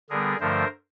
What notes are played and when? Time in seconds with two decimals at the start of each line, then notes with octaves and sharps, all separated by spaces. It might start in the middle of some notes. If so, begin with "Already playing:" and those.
0.10 D3 G3 B3 G#4 A#4
0.40 G2 D3 F3 A3 A#4 C5